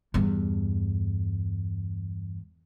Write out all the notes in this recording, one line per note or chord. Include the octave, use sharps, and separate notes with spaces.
E2 G2